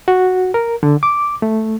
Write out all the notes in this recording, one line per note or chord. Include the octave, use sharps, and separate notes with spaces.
F#4
A#4
D3
D6
A3